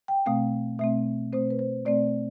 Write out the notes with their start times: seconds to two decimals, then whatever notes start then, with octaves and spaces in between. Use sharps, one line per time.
0.08 G5
0.26 B2 A3 C4 F5
0.79 B2 A3 C4 E5
1.33 B2 A3 C4 C5
1.50 B4
1.59 C5
1.85 B2 A3 C4 D5